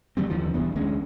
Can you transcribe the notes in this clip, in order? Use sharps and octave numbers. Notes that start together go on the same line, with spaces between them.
D3 F#3 G3 C4
D#2 D3 E3 F3
E1 G2 E3 B3
D2 D3 G#3 C#4